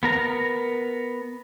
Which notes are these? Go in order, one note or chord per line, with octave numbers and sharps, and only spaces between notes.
B3 A#4 A#5